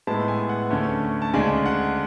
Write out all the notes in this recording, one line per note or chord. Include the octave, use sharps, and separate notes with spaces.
A2 G#3 B3 E4 A5
G#5
F#5
D2 D3 A3 C#4
A5
D2 C#3 G#3 D4 G#5
F#5